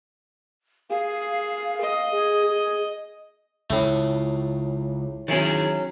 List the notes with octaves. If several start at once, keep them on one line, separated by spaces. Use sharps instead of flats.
G#4 F5
D#5
G#4
G#4
C#2 A2 A3
D#3 F#3 C#4 E4 G#4